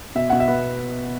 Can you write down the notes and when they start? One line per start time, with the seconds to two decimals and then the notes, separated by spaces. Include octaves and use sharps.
0.15 B2 E5
0.30 B2 F#5
0.40 E5
0.48 B3